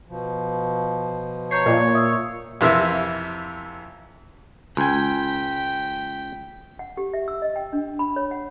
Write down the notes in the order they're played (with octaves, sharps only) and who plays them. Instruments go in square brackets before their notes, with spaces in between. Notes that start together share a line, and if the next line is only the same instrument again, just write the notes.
[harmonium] B2 F3
[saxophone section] C#5 [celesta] A#5 G6 C7
[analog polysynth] A#2 [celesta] D5 D#5
[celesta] E5 D#6 E6
[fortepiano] F2 C3 E3 A#4 E5
[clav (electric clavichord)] C#2 G#5 [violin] G5 B6
[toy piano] F#5
G4
E5
E6
D#5
G5
D4
B5
C#5
F#5